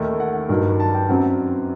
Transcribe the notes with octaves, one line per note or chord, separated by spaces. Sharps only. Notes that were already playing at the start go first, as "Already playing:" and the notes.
Already playing: D#2 D#3 A3
F#5
G2 D#3 F#3
A5
G5
F#2 F#3 C4 F#5